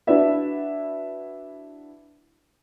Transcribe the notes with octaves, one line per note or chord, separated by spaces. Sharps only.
D4 E4 F#4 B4 D5 E5